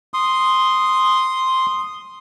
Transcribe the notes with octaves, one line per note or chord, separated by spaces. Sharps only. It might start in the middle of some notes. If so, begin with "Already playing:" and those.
C6 D#6